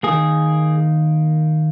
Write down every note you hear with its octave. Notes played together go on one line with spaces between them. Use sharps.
D#3 A#3 G#4